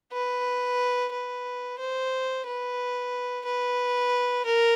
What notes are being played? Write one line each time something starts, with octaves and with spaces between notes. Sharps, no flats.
B4
B4
C5
B4
B4
A#4